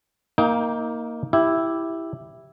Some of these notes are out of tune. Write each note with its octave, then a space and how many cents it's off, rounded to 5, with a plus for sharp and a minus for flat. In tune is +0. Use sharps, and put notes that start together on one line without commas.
A#3 +0 D#4 +25 G5 +0
E4 +0 G4 +0